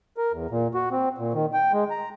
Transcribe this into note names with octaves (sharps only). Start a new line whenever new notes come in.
A#4
E2
A#2
F#4
C4
A#2
D#3
G5
G#3
A#5